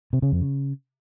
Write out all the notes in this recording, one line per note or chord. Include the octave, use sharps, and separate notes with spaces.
C3
C#3
F2
C#3